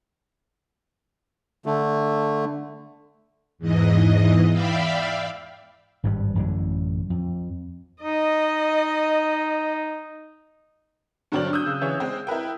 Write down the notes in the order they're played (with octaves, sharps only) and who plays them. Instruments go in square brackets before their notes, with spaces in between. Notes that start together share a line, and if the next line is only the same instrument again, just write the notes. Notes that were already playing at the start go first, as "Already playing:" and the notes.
[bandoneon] D3 A3
[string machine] E2 G#2 E3 D#5
D5 E5 F5 G5 B5
[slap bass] G#1 G2 D#3 G3
A1 F#2 A2 D3
F2
[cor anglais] D#4 [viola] D#5
[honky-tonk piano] G2 D3 F#3 C4 D5 F#7
D#6 E6 F#6 G6
C#3
C#3 E3 C#5
G#3 C4
E4 A#4 B4 G5